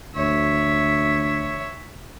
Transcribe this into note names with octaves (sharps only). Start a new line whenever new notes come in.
D2 C#5 E5